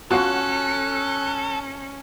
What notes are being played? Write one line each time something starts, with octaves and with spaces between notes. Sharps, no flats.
C#4 F4 F#4 A4 F#6